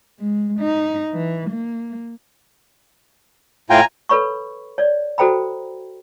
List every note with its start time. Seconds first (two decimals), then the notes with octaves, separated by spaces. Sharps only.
0.20 G#3
0.60 D#4
1.13 E3
1.50 A#3
3.70 A2 F4 G5 G#5 A#5
4.09 A4 B4 C#5 B5 C#6
4.78 C#5 D5
5.18 F#4 A4 C5 G5 A#5 B5